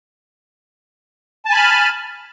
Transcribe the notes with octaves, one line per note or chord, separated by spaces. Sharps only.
G#5 A5 B5 F6